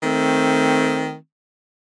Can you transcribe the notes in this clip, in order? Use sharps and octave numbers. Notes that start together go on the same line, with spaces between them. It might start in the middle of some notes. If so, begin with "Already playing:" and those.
D#3 A3 C4